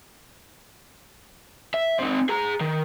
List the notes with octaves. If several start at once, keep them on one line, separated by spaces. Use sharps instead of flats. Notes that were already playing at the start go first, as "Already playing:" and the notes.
E5
C4 D#4
G#4 A#5
D#3